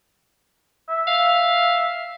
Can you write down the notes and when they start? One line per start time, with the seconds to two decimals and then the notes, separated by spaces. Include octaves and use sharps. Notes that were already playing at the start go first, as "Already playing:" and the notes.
0.89 E5
1.07 F5